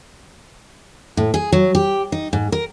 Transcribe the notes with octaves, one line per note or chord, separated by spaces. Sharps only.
A2
G#4
F#3
G4
D#4
G#2
A#4